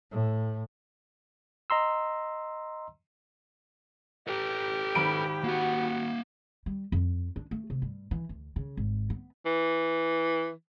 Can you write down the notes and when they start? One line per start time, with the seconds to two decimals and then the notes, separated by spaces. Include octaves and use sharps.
0.12 A2
1.70 D#5 A#5 C6 E6
4.27 G4 A4 B4
4.95 G#1 B5 D7
5.44 A#3 F#4 F#5
6.66 G3
6.92 F2
7.36 D4
7.51 A3
7.70 C3
7.82 G2
8.11 E3
8.29 D2
8.56 C#3
8.77 G#1
9.10 B3
9.46 E3